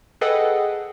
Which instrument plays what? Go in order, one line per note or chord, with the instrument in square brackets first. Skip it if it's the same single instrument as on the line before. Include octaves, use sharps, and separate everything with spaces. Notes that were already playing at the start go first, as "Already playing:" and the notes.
[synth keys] G#4 A4 B4 D#5 F#5 G5